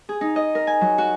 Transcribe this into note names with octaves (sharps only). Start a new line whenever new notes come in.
G#4
D#4
D#5
A#4
G#5
F#3
F#4